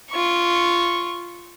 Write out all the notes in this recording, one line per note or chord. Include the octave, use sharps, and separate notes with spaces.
F4 C#6